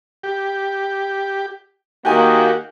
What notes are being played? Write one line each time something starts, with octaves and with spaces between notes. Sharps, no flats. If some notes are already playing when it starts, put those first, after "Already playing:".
G4
D#3 A#3 F#4 G4 G5 G#5